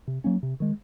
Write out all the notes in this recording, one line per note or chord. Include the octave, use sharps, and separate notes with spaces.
C3
F#3 A#3 C#4
C3
D#3 G#3